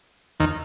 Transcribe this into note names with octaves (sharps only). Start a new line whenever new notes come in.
D#2 D#3